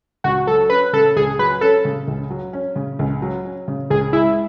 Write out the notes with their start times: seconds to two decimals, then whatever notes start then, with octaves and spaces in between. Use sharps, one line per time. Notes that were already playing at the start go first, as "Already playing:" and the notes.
0.24 C#2 F#4
0.47 F#3 A4
0.70 C#4 B4
0.93 C#3 A4
1.16 C#2 G#4
1.39 F#3 B4
1.61 C#4 A4
1.85 C#3
2.08 C#2
2.30 F#3
2.53 C#4
2.76 C#3
2.99 C#2
3.22 F#3
3.45 C#4
3.68 C#3
3.90 C#2 G#4
4.13 G#3 E4